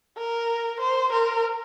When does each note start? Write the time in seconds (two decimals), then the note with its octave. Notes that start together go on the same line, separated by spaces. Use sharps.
0.18 A#4
0.80 C5
1.12 A#4